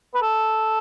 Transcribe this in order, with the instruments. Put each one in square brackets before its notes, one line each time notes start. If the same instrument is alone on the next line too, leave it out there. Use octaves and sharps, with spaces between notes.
[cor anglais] B4
A4